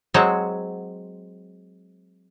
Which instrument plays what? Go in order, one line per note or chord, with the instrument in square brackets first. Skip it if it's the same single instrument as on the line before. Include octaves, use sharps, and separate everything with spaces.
[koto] F#3 G#3 C4 C5 F#5